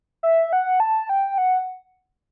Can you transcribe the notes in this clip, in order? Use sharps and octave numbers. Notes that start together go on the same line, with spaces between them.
E5
F#5
A5
G5
F#5